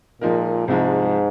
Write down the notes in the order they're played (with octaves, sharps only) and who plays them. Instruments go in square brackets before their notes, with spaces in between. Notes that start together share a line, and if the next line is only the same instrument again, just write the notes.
[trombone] A#2 [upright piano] F3 G#3 D#4 A#4
[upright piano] C2 C3 F3 G#3 [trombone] G#2